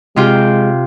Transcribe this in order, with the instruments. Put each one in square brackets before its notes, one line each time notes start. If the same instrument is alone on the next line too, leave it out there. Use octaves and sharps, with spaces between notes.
[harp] C3 F4 G5 [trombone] G#3